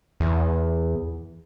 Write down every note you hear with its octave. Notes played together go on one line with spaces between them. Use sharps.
E2